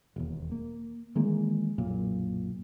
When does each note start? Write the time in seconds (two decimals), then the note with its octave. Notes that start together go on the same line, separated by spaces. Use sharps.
0.16 E1 D#2
0.51 A#3
1.16 D#3 E3 G#3 A#3
1.78 B1 F#2 A#2